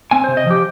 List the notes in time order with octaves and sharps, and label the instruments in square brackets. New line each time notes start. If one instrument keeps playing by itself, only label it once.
[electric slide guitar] C4 G#5
C3 C5
D#5
F3 G4